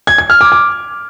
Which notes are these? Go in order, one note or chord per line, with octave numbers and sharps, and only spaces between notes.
G#6
G#6
F6
D6
D6